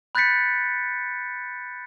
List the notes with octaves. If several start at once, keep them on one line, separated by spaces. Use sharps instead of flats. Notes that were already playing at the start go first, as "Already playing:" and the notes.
B5 F#6 G6 A6 B6 C#7